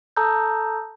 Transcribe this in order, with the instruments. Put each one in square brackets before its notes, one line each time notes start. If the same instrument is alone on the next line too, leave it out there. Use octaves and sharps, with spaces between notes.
[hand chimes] A4 A5 A#5 D#6 E6 G6